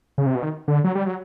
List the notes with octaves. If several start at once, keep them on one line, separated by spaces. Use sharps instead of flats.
C#3
C3
B2
D#3
D3
F#3
G3
F#3